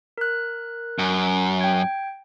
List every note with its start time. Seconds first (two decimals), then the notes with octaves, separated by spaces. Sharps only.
0.18 A#4 F#6
0.99 F#2
1.61 G5 G#6